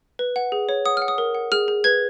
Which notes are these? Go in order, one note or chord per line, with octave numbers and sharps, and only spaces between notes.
B4
F#5
G#4
C#5
F#5 D#6
F6
F#5
D#6
A#4
F#5
G#4 F6
G#4
B4 G#6